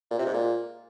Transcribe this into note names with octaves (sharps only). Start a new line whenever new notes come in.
A#2
C3
G#2
A#2